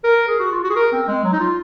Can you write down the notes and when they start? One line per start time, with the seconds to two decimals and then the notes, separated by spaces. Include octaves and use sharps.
0.04 A#4
0.28 G#4
0.39 F#4
0.52 F4
0.64 F#4
0.70 G#4
0.76 A#4
0.92 C4
1.08 G#3
1.24 F#3
1.33 D#4
1.40 F4